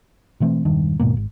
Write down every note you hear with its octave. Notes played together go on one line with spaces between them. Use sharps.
B2 E3 A3 C4
E1 G2 D#3
D#2 G#2 B2 A#3
G#1